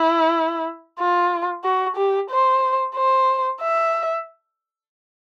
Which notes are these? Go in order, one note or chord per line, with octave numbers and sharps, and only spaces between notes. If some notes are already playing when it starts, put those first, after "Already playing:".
Already playing: E4
F4
F#4
G4
C5
C5
E5